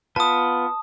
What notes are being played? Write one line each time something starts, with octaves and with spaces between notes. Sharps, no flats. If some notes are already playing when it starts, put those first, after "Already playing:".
B3 F4 B4 A5 D#6